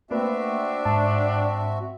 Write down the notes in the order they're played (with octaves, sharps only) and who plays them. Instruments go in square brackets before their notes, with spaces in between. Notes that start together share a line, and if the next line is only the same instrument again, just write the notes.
[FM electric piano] A3 A#3 B4 [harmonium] C4 F#4 E5 [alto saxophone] D4
[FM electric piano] G#2 A5